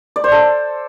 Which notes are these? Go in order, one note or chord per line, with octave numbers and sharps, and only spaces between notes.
D5
C5
A4